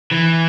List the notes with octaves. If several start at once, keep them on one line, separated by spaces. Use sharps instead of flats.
E3